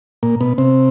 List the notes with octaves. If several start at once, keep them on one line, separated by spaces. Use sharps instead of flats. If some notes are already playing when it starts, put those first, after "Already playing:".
A#2 A#3
B2 B3
C3 C4